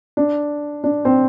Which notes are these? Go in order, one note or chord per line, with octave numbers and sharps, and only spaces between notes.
D4
D4
C4